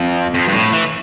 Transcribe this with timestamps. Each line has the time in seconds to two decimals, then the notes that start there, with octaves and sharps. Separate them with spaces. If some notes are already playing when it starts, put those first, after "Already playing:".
Already playing: F2
0.34 F2
0.48 G2
0.53 A2
0.73 E3